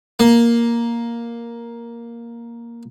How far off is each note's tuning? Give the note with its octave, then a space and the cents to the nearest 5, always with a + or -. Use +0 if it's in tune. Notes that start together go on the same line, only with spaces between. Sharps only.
A#3 +5